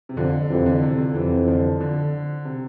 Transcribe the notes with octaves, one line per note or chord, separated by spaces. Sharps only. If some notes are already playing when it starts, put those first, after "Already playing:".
C3
F2 D3
F2 C3 E3
D3
C3
D3
F2 C3 E3
D3 F3
D3
C3